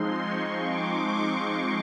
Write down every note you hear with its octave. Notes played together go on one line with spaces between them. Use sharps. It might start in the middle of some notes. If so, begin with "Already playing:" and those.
Already playing: F3 G#3 C4 D#4 C6
C#6
D6
C#6